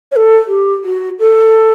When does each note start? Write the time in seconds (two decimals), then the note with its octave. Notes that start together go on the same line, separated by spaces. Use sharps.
0.12 C#5
0.16 A4
0.48 G4
0.84 F#4
1.20 A4